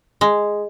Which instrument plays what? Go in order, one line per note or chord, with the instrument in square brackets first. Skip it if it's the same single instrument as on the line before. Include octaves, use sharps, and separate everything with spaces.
[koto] G#3